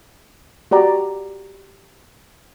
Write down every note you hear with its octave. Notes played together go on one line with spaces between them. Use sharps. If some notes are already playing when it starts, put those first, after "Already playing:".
F#4 G4 D5 A#5